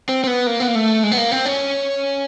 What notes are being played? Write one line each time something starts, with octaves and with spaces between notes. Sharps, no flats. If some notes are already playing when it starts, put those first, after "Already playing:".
C4
C4
B3
A#3
B3
A#3
A3
G#3
B3
A#3
C4
C#4